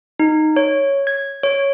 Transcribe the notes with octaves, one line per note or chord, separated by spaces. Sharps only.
D#4
C#5
G#6
C#5